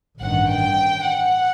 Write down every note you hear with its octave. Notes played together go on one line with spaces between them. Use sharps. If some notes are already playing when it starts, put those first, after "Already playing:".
A1 G2 D#3 F#5
G5
F#5